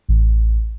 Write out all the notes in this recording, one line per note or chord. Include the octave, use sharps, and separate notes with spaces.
A1